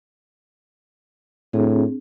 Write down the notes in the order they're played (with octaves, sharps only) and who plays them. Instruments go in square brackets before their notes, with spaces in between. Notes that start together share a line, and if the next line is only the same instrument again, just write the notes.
[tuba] A2 [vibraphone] C4 D4 G#4